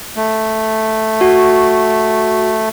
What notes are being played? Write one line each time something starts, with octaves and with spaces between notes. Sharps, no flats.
A3
F#4